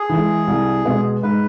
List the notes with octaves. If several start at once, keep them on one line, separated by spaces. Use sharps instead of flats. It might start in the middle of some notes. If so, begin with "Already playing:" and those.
Already playing: G#4
E3 G#3
C2
B2 G#3 B3
G#2 B4